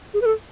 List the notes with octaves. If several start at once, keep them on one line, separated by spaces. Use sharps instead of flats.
G#4
B4
A4